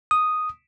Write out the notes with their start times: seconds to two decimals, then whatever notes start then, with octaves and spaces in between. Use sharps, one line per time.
0.11 D#6